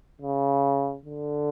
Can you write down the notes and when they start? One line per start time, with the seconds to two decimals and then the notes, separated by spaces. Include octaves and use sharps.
0.22 C#3
1.05 D3